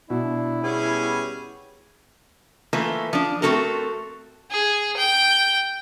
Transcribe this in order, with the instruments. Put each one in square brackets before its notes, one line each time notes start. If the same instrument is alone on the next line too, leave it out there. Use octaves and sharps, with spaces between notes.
[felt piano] B2 [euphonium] D4 [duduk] E4
[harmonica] G3 C#4 G#4 [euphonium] B3
[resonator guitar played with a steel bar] E3 A3 A#3 F4 B4
F3 D4
A3 C4 F4 F#4 A4 A#4
[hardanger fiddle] G#4
G5